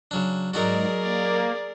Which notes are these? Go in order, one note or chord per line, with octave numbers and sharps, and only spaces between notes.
C#3 F#3 D4
G#2 F#3 D#4 F#4 G#4 A#4 D5
A#3 D5